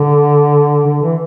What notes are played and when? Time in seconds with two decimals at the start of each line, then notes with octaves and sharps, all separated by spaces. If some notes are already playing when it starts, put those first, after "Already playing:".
Already playing: D3
0.86 D3
1.02 E3